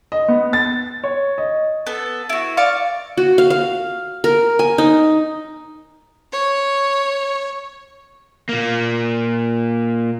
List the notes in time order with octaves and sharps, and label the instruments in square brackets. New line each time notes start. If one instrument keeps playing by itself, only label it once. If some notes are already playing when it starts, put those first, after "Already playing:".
[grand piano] D#5
B3
A6
C#5
D#5
[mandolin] B3 A4
E4 F#4
D5 F5 C#6
[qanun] F#4
F5
F5
A#4
G#5
D#4
[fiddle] C#5
[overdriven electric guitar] A#2 A#3